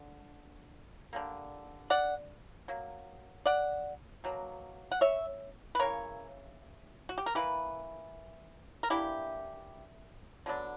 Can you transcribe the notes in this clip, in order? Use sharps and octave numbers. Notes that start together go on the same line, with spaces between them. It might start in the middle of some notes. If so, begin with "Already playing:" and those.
Already playing: D3
D3 G3 A#3
D5 F#5
F#3 A#3
D5 F#5
B2 F#3 A#3
F#5
C#5 E5
B4
C#3 E3 A#3 A#4 C#5
F#4
G4
A#4
E3 A#3 E4 G4 B4
A#4
E3 A#3 D4 E4 G4
D3 F#3 B3 D4